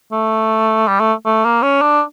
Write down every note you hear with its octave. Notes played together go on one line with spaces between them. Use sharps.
A3
G3
A3
A3
A#3
C#4
D4